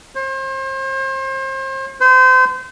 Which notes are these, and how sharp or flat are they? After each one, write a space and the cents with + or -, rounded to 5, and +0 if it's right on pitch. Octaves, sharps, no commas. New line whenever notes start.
C5 +35
C5 -30